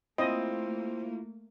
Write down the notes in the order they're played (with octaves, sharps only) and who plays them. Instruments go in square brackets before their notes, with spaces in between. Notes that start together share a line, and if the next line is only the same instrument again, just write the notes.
[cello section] A3 A#3 [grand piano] C4 [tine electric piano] E4 F4 [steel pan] D#5